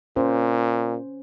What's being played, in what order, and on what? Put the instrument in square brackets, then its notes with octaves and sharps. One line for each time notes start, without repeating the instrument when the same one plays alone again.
[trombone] A#2 [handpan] C#4 C5